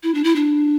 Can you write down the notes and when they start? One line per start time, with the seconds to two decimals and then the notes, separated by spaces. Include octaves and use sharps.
0.03 E4
0.15 D4
0.24 E4
0.36 D4